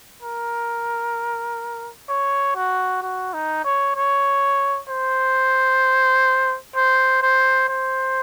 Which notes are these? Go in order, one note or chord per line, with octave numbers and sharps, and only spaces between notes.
A#4
C#5
F#4
F#4
D#4
C#5
C#5
C5
C5
C5
C5